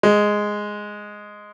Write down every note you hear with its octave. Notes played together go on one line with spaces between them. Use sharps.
G#3